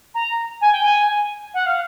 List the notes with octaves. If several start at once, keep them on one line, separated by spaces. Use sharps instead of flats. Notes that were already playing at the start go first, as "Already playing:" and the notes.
A#5
G#5
G5
G#5
F#5
F5